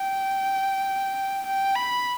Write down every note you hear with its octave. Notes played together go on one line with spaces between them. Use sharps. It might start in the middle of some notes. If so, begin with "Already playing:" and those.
Already playing: G5
G5
B5